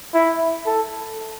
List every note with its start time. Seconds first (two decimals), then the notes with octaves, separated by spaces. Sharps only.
0.14 E4
0.66 A4